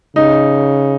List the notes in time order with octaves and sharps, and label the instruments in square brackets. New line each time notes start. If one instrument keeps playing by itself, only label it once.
[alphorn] C#3 [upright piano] D#4